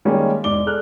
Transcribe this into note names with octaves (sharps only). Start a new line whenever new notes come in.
D#3 G3 G#3 A#3 C#4
E1 G#2 D5 D6 G7
G#4 A4 D5 F6 F#6